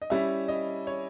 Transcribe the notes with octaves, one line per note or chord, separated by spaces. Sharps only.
D#5
G3 C#4 E4 E5
D#5
C#5